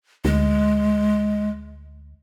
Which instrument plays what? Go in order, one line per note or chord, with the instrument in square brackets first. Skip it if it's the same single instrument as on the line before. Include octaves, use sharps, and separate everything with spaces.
[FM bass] D2 [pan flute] G#3